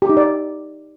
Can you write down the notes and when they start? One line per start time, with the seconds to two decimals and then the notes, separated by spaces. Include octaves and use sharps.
0.02 G4
0.09 D#4
0.17 D5